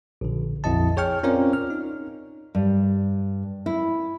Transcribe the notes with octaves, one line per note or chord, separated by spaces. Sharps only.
A#1 D3
A#1 F2 E4 D#5 A5
G#4 C#5 G5 C#6 F6
C4 C#4 F4 A#4 C#5 D5
F6
D#4
G2
E4